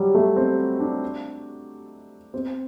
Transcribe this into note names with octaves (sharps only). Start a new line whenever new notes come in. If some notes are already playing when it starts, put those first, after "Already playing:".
Already playing: F#3 G3
A3
C4
D4
C4